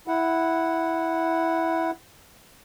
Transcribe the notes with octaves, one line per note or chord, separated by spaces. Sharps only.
E4 F#5